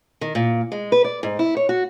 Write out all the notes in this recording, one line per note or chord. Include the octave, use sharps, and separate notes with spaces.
D#3
A#2
G#3
B4
D5
G#2
E4
C#5
F#4